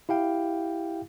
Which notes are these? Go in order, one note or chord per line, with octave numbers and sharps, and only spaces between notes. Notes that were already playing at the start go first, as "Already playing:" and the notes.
E4 G4 F5 G5